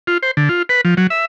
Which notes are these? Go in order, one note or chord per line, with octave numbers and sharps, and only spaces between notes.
F4
C5
D3
F4
B4
F3
F#3
E5